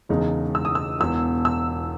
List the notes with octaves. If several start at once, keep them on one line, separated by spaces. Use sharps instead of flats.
E1 E2 C#3 G#3 D#4
E6
D#6
E6
E1 E2 B2 E6
E6